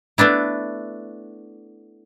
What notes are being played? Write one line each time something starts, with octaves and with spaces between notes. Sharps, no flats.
A3 B3 D4 E4